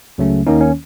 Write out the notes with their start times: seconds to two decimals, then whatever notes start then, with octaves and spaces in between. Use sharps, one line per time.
0.18 C#2 C#3 F#3 A3 C#4
0.47 D#2 D#3 A#3 C#4 D#4
0.61 C#4